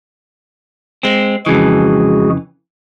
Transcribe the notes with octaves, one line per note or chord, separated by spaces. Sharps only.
G#3 C4
F2 C#3 E3 G#3 F#4 G#4